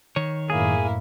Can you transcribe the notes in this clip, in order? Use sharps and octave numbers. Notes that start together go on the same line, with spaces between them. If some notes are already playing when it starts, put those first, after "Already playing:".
D#3 C#5
F#2 A2 A#3 E4 G#4